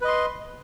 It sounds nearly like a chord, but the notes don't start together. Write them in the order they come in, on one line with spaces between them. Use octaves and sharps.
B4 D#5 C6